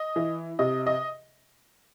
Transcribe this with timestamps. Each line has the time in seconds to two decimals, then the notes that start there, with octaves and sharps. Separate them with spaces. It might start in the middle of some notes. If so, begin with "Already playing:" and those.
Already playing: D#5
0.16 E3
0.59 C3 D#5
0.87 D#5